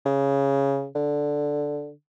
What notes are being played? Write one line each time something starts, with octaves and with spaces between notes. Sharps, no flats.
C#3
D3